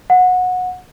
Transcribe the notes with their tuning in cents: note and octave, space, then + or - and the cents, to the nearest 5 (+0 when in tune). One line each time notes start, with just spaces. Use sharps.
F#5 -20